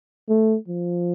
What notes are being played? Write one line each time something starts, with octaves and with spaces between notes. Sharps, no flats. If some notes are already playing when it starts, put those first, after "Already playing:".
A3
F3